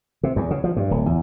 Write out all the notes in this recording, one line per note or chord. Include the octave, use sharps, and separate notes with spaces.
C3
E2
C#3
F3
G2
D1
E2